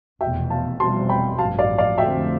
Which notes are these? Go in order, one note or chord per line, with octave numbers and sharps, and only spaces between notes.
F1 E2 B2 E5 G5
F5 A5
F1 E2 B2 G3 C4 A5 C6
G5 B5
A1 G2 F3 F5 A5
D5 F5
D5 F5
F2 D3 A3 C4 E5 G5